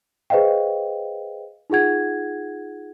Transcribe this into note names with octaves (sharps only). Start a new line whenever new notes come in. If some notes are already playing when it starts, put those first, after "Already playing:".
G#4 B4 C5 D#5 F5 G5
D#4 F4 G#4 F#5 G#6